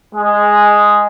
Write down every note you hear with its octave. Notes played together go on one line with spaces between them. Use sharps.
G#3